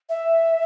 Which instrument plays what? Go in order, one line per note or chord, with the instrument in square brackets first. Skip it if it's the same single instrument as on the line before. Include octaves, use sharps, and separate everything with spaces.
[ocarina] E5